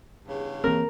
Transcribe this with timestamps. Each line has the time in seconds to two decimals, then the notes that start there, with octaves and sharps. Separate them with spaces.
0.25 E2 G2 C#3
0.64 E3 A#3 C4 A#4